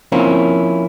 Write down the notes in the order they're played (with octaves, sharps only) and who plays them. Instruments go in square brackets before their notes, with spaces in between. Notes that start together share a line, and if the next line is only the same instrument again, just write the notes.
[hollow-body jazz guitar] F3 A#3 C4 C#4 E4